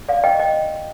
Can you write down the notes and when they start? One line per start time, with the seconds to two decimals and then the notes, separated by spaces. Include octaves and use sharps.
0.09 D5 F5
0.24 D#5 G5
0.39 D#5 G5